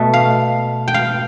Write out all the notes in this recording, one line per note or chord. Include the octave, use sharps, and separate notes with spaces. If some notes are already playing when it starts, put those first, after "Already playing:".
Already playing: B2 A3
F5
G5
F5